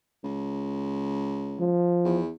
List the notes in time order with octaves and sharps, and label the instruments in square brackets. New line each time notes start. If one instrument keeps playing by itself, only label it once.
[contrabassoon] C#2
[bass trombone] F3
[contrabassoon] E2